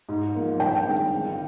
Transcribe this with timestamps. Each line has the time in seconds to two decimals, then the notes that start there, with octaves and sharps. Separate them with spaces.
0.09 G#2
0.35 F3 A#3
0.59 G2 G5
0.85 D#3 G#3 C4
1.11 G1